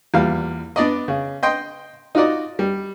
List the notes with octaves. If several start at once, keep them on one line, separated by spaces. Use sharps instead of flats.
E2 A#2 G3 F5
B3 D4 D5 D#5
C#3
D#5 G5 C6
D#4 F4 F#4 D5 D#5
G3